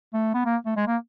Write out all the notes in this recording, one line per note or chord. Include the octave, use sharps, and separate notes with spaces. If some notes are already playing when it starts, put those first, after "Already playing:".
A3
B3
A#3
A3
G#3
A#3